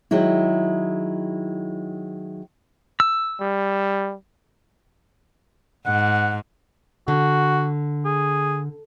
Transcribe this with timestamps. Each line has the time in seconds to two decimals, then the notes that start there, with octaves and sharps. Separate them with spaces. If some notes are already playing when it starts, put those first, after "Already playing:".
0.11 D#3 F#3 G#3 E4
3.00 E6
3.40 G3
5.86 G#2 F#5
7.08 D3 F#4
8.05 G#4